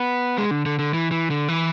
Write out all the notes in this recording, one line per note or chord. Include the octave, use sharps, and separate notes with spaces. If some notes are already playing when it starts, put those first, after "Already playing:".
Already playing: B3
G#3
D3
D3
D3
E3
E3
D3
E3